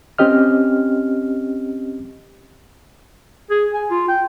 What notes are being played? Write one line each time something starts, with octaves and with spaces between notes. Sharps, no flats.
C4 C#4 G4 D#5 F6
G#4
G#5
F4
G5